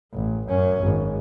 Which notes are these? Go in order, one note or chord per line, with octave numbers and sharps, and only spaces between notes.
A1
F#2 C#4
G#1